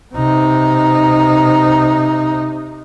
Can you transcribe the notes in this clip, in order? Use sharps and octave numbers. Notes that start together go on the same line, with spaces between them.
C3 D#4